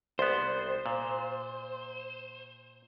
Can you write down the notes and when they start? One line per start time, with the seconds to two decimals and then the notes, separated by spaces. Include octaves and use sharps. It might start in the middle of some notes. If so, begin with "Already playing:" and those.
0.19 C2 B3 C5
0.86 A#2